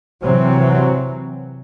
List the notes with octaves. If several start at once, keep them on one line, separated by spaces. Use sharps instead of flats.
C3 E3 F#3 C4